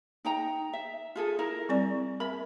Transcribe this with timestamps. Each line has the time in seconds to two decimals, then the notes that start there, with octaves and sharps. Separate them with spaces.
0.25 D#4 G5 A#5
0.73 E5
1.16 F4 G#4 A4
1.39 E4 A#4
1.69 G3 C4 D5
2.20 A#4 E5 B5